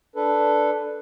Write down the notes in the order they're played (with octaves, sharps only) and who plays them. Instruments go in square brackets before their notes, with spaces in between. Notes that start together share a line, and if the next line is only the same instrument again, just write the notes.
[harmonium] D4 A4 B4